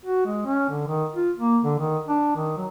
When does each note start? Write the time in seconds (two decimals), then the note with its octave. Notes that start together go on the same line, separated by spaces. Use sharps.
0.05 F#4
0.26 G#3
0.46 C#4
0.70 D3
0.88 D#3
1.14 F4
1.37 A#3
1.64 D3
1.79 D#3
2.08 D4
2.36 D#3
2.57 F#3